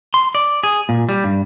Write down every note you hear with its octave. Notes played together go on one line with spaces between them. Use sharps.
C6
D5
G#4
A#2
G3
G2